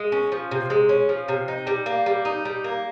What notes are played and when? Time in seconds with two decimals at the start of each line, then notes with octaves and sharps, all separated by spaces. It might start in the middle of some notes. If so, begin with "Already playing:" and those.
Already playing: G#3
0.12 C#4
0.32 F3
0.51 C3
0.70 G#3
0.89 C#4
1.09 F3
1.28 C3
1.48 D#4
1.67 G3
1.86 A#3
2.06 G3
2.25 D#4
2.45 G3
2.64 A#3